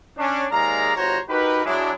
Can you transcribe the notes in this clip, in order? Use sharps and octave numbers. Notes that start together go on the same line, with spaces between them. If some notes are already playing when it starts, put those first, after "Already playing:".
C#4 D4
D#2 G#3 G#4 D5 F5 A#5
G1 F#4 C5 C#5 A#5
D#4 F#4 G4 A#4 B4
F#3 G#3 D4 E4